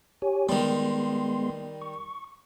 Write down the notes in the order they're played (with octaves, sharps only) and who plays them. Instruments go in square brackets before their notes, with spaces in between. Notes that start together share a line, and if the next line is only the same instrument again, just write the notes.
[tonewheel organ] G4 C#5 G#5
[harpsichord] D#3 G3 [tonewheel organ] G#3 B3 C6
[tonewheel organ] C#6